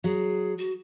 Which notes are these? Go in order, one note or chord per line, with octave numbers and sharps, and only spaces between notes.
F#3 G#4
F#4